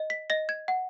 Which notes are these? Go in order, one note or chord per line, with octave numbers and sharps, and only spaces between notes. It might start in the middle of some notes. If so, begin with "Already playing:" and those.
Already playing: D#5
B6
D#5 A#6
G#6
F#5